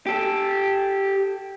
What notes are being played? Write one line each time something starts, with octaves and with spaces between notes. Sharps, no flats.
G4 A4